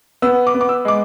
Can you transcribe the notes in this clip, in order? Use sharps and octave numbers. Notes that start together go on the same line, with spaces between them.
B3 E6
D6
B3
D6
E6
G#3 D6